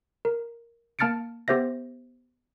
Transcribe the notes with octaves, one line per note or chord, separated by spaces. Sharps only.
A#4
A#3 A5 F6 A6 C#7 D7
B3 G4 C5 E5 A#6